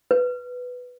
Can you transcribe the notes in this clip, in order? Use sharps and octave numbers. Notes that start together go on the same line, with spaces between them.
B4